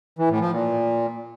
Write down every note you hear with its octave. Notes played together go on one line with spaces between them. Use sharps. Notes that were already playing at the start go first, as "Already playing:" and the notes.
E3
A2
F3
A#2